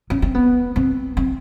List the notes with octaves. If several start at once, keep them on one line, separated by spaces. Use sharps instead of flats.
C#4
C4
B3
C4
C4